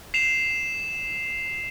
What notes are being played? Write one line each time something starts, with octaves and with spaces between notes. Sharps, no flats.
C7 E7 F7